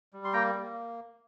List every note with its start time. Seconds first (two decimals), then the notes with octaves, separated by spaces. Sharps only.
0.13 G3
0.24 C6
0.33 A#3 G5 A#5
0.55 A#3